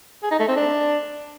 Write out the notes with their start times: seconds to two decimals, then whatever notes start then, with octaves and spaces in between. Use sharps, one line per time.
0.23 G#4
0.31 D#4
0.40 A3
0.48 C4
0.56 D4